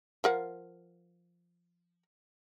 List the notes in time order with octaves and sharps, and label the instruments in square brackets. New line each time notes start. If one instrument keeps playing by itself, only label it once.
[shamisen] F3 A#4 F#5